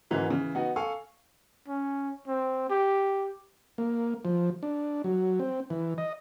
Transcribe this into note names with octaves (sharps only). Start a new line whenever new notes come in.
G#2 C#3 E3 F#3 A#3
C#3 E3
B3 D#4 F#4
A4 F5 G#5 C#6
C#4
C4
G4
A#3
F3
D4
F#3
C4
E3
D#5